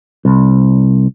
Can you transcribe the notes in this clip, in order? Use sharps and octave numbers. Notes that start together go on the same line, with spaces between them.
C2